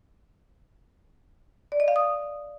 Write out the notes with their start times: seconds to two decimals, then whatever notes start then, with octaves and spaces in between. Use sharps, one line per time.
1.72 D5
1.80 D#5
1.88 F5
1.96 D#6